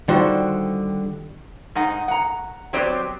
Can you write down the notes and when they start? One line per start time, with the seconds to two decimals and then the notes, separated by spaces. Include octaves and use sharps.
0.08 D3 D#3 G3 F4 F#4 C5
1.75 G#2 D#4 F#5
2.08 F#5 A#5
2.73 F#3 B3 C4 G4 C5 D5